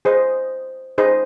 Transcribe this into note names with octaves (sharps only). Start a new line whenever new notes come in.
G#4 C5 D#5
D#4 G#4 C5 D#5